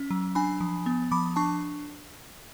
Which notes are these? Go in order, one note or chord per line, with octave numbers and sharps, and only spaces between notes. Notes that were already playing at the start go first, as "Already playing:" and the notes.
Already playing: C#4
F#3
D4 G#5 B5
F3
B3
F3 B5 D6
D4 A5 C#6